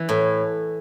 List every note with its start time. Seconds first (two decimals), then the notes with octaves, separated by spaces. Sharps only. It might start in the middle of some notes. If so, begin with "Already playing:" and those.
Already playing: E3
0.09 A2